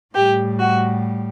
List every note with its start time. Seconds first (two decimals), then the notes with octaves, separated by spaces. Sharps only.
0.14 A2 G3 G4
0.59 F#4